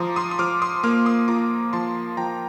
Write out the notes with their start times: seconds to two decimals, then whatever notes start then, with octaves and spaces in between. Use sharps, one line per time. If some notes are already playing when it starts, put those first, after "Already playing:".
Already playing: F3 F4 A#5 C6 D6 D#6
0.16 C6 D#6
0.31 D#6
0.39 F3 D6 F6
0.62 C6 D#6
0.83 A#3 D6 F6
1.06 C6 D#6
1.28 F4 A#5 D6
1.73 F3 A5 C6
2.17 F3 G5 A#5